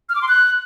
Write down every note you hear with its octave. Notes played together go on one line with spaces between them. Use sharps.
F6
D6
C6
F#6